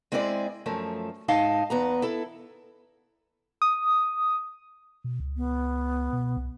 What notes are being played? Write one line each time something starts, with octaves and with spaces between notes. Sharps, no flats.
G#3 C4 E4 G#4 C5 D5
F#2 F3 A3
G#2 D#4 D#5 F5 A5
E2 B3 A#5
E4 A4
D#6
B2
C#2
B3
B2
C2